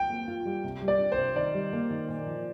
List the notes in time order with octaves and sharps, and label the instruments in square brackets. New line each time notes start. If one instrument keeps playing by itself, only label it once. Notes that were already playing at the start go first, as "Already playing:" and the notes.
Already playing: [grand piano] G5
[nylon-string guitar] A#3
F4
G3
C3
G3
[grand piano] D5
[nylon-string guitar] D4
[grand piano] C5
[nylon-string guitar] C3
[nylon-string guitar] D#3 [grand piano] D5
[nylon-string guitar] G3
A#3
D#3
A#2
F3